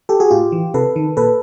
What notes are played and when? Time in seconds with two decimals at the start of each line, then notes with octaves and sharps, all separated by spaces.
0.09 G4 A4
0.20 F#4 G#4
0.31 A2 F4 G4
0.52 E3
0.74 C3 A4 B4
0.96 D#3
1.17 A#2 A4 B4